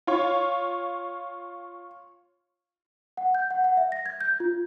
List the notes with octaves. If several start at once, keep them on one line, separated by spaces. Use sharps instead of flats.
F4 C#5
F#5
G6
F#5
F#5
E5
A#6
G#6
G6
F4